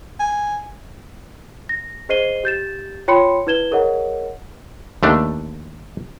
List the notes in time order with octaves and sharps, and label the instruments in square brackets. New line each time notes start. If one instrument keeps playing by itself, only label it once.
[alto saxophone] G#5
[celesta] A#6
G#4 C5 D#5 C7 D#7 G7
G4 G6 A6 E7
F4 C#5 G5 B5 C6 C#7
E4 B4 G#6 E7 G7
G#4 A#4 C#5 D#5 F#5
[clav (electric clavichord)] D#2 A3 D4